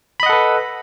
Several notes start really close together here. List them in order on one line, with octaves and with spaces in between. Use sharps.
B5 D#5 F#5 A4 B4